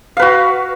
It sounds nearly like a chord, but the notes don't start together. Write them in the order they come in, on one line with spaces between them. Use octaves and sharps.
F5 B4 F#4